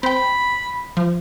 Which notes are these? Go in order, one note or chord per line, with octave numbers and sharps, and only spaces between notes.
C4 G5 B5
F3